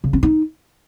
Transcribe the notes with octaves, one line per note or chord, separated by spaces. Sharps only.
C#3
C#4
D#4